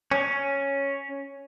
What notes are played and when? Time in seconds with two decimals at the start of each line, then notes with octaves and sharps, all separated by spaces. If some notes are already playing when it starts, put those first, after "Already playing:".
0.11 C#4